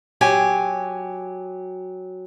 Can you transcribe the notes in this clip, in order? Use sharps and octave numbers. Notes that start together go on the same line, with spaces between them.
F#3 G4 G#5